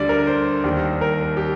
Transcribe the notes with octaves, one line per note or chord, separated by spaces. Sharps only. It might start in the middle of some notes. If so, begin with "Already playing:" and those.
Already playing: D2 D3 G3 D5
A#4
C5
D#2 D#3 G3
A#4
G4